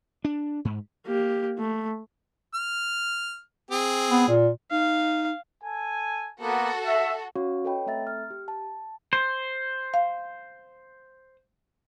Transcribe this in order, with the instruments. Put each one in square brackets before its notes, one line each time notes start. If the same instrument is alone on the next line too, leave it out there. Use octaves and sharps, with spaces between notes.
[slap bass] D4
G#2
[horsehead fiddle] A#3 G4
A3
[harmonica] F6
C4 G#4
[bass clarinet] B3
A#2
[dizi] D#4 [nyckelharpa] F5
[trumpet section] A4 G#5
[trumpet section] A#3 B3 [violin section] F#4 A4 F#5
[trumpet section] E5
[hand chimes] C#4 F#4 C#5 F5 C#6
A4 B4 C#5 D#5 G5 B5
A3 C4 A4 E5 A#5 A6
F6
G4
A5
[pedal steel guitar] C5
[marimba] F5